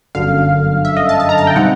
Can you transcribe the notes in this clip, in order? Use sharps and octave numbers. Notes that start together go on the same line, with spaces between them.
G1 F#2 D3 F5
E5
D#5
A5
A5
A#5
A5
G5
B2 G3 C4 D#4 F#5